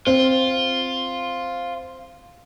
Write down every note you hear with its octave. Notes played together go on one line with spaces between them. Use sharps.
C4 F4